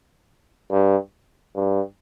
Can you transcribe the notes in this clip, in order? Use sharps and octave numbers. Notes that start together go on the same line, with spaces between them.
G2
G2